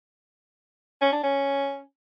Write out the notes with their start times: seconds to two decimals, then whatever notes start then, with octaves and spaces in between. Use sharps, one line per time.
1.01 C#4
1.12 D4
1.24 C#4